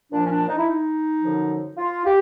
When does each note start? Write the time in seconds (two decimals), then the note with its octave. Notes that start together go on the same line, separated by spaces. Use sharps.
0.12 A#2 F3 D4
0.24 C#4
0.30 D4
0.48 D#4
0.58 E4
0.67 D#4
1.22 F#2 D3 F3
1.77 F4
2.05 G4